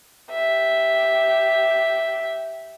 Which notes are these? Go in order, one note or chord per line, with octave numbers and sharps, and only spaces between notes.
G4 E5